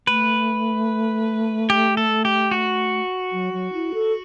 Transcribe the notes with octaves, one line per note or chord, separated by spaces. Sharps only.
A3 B4
G4
A4
G4
F#4
F#3
F#3
E4
A4